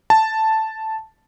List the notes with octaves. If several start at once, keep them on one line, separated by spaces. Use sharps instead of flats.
A5